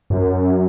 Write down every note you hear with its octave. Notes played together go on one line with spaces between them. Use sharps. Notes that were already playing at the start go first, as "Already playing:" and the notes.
F#2